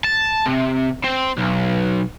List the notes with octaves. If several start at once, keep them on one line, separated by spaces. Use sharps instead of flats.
A5
C3
C4
B1